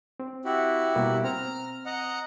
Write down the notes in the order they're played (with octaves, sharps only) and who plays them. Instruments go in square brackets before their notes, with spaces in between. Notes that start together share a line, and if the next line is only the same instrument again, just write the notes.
[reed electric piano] C4
[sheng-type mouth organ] E4 F#4 G4
[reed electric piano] B2 G3 A#3
[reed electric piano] C4 [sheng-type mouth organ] A#5 F6
[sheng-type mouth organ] D#5 F#5 A#5